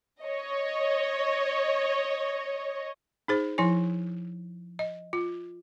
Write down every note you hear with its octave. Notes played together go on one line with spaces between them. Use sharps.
C#5 D#5
D#4 G#4 C5
F3 E4 G#5
D#5
F4